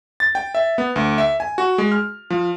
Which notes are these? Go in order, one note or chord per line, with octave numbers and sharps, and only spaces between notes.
A6
G5
E5
B3
D2
E5
G#5
F#4
G#3
F6
F3